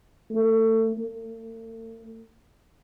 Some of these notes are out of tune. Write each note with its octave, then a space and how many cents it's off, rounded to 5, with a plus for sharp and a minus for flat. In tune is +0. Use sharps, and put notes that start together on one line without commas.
A3 +25
A3 +45